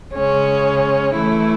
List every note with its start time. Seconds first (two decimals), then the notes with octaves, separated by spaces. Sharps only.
0.14 C#3 G#3 C#4
1.14 E3 A3 E4